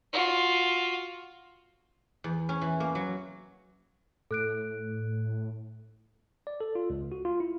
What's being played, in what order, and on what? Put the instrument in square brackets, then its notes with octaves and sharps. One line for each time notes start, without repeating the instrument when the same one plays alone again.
[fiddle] F4 F#4
[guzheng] E2
C#4
E3
A#3
F#3
[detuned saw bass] A2 [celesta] A4 F#6 D7
[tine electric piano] D5
A4
F4
C#2
F#4
F4
E4